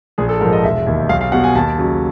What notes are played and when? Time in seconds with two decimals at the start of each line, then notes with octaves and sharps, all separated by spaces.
0.18 A#1 G#4
0.29 A4
0.41 G#2 A#4
0.45 F3
0.53 D#5
0.63 E1 E5
0.87 D#2 D#3
1.09 B1 F5
1.21 F5
1.32 B2 G3 F#5
1.44 G#5
1.55 D#2 A5
1.78 C#3 F#3